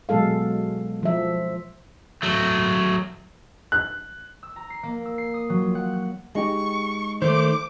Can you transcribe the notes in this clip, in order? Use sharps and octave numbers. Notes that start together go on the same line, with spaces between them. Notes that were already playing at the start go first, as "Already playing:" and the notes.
B2 F#3 G#3 A4 F5
F3 E5
F#3 A3
F#6
E6
A#5
C7
A#3
E6
C7
D#6
F#3
F4
F#5
F#6
G#3 D#4 G4 C#6
D#3 A3 C5 D6